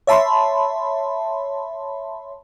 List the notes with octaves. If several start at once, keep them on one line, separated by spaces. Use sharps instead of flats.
C#5 E5 A5 B5 C6